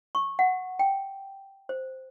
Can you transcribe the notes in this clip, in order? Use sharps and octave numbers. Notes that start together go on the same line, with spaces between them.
C#6
F#5
G5
C5